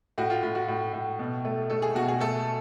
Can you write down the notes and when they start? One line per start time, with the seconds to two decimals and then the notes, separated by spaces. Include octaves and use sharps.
0.18 A2 F#4
0.30 F4
0.43 A2 F4
0.55 F#4
0.68 A2
0.93 A2
1.19 B2
1.45 A3
1.70 A3 A4
1.82 G#4
1.95 B2 F#4
2.08 G#4
2.21 A3 A4